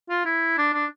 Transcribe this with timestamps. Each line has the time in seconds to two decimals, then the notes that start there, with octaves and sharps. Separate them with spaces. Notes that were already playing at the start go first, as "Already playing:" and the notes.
0.10 F4
0.25 E4
0.58 D4
0.73 D4